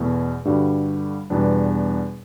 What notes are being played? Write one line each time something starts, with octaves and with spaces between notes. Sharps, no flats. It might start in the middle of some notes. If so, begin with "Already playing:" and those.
Already playing: E2 B2 A3 E4
G2 D3 G3 D4 F#4
E2 B2 G3 B3 D4